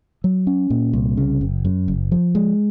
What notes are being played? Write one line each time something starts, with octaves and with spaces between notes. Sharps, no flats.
F#3
C#4
A#2
C2
C#3
F#1
F#2
F#1
F3
G#3